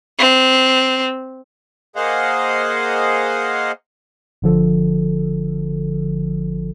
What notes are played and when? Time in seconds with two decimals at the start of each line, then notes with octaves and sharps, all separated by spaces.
0.19 C4
1.96 A#3 G#4 C5 D#5 F5 F#5
4.42 G1 D3 F3 A4